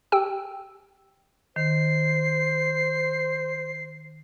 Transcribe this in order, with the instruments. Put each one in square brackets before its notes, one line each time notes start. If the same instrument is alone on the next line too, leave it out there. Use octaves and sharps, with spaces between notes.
[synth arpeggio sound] G4 G5 E6
[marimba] D#3 [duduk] C5 [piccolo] C7